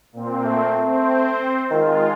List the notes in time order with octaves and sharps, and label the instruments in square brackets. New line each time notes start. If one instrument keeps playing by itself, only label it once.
[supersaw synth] A#2 C4
[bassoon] A3
[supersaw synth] C4 C5
[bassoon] D#3 [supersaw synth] G#3 F4